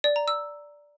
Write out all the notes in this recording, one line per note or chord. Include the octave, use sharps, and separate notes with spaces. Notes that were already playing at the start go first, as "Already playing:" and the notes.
D5
A#5
E6